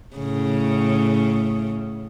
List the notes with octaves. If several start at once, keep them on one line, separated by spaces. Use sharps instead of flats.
A2 C#3